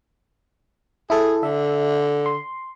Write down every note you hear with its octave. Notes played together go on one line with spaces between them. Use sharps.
E4 G#4 A4
D3 E5
C6